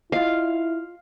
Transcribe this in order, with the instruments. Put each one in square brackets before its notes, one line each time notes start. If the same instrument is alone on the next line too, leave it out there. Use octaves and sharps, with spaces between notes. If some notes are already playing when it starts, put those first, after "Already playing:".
[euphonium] E4 [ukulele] F4 D#5 [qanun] F5